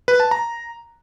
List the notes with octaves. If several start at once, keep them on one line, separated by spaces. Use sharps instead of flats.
B4
A5
A#5